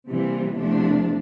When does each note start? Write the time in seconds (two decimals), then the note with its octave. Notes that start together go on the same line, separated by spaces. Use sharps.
0.08 C3 E3 G3 A#3
0.58 E2 C3 F3 A3 D4